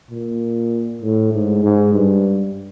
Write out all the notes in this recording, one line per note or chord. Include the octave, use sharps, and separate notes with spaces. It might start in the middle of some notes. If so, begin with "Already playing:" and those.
A#2
A2
G#2
G#2
G2